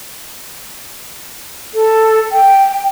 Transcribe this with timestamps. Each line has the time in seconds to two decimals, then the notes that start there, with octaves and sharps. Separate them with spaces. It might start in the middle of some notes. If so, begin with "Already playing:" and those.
1.74 A4
2.32 G5